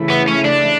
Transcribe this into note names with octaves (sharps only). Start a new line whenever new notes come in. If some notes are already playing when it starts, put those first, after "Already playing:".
Already playing: C#3 E3 A3 E4
B3
C#4
D4